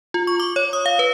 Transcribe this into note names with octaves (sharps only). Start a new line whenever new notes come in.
F4
C#6
D6
C#5
D#6
F5
B4